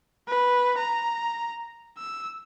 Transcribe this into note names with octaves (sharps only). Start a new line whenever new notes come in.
B4
A#5
E6